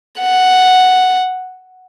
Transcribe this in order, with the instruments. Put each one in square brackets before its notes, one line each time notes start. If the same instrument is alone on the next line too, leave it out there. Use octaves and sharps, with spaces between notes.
[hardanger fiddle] F#5